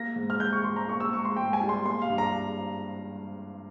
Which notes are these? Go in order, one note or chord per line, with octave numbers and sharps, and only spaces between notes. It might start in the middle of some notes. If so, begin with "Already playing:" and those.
Already playing: A#3 A#6
G#2
F6
G#2 G6
C#6
G#2 C6
A#5
A#3 C#6
E6
G#2 C#6
C6
G#2 G5
G#5
G3
C6
A#3 C6
F5
G2
A#5